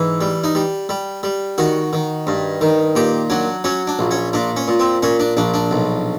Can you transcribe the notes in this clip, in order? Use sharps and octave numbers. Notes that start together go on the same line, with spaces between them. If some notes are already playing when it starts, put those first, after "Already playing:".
Already playing: G#2 E3
G3
D#4
G3
G3
G3
D#3 F#4
D#3
G2
D#3
A#2 G4
F#3 D4
F#3 C#4
D4
A#1
C#4
A#2 D4
C#4
A#2
C4
A#2 C#4
D4
A#1 D4
D4
B1